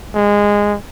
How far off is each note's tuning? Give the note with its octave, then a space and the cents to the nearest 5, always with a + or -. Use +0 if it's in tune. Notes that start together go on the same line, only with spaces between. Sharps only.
G#3 -15